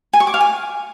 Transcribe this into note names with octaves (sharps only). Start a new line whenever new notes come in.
G#5
C#6
D6
F5
G#5